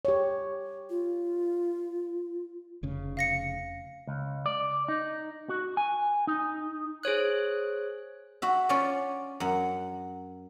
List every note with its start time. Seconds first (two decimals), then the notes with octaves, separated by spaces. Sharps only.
0.05 G4 C#5
0.90 F4
2.83 F1 C#3
3.17 F5 A#6 C#7
4.07 C#2
4.46 D5
4.88 D#4
5.49 F#4
5.77 G#5
6.27 D#4
7.03 G#4 C5 C#5 F#6
8.42 F#4 E5
8.69 C#4 F4 C#5 D5 G#5
9.40 F#2 F#5